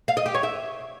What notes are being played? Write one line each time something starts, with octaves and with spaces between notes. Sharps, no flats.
F5
D#5
G4
C#5
E5